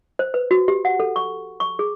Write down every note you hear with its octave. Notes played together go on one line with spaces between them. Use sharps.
C5
B4
F#4
G4
F#5
A4
C#6
C#6
G#4